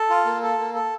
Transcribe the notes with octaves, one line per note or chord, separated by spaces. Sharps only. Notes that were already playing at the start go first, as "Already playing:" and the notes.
Already playing: A4
F4
A#3
A4
A#3
A4